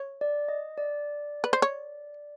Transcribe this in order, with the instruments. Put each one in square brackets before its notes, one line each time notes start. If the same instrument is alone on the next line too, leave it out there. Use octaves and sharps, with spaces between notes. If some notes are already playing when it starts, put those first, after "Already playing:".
Already playing: [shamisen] C#5
[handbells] D5
D#5
D5
[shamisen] B4
C5
C#5